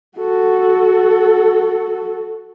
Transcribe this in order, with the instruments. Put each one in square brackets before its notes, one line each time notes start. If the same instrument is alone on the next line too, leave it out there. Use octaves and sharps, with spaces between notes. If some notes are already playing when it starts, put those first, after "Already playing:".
[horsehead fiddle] F#4 A4